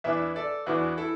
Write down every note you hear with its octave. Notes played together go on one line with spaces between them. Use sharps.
E2 E3 D4 B4 E5
A4 D5
E2 E3 D4 F#4 B4
E4 A4